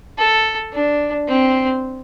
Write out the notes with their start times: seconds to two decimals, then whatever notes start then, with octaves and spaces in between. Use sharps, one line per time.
0.18 A4
0.73 D4
1.28 C4